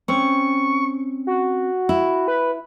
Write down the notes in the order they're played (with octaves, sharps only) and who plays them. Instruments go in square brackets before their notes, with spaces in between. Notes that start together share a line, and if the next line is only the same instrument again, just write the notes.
[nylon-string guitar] C4 C#4 [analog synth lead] C#6
[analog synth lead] F#4
[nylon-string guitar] E4
[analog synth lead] B4